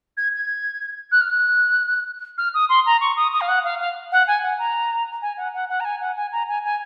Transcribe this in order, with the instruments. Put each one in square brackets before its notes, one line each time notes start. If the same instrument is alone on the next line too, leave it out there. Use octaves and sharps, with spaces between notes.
[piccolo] G#6
G#6
F#6
F6
F#6
F6
D#6
C6
A#5
C#6
D#6
D#6
F5
F#5
F5
F5
F#5
G#5
F#5
A#5
G#5
F#5
F#5
F#5
A#5
G#5
F#5
G#5
A#5
G#5
G#5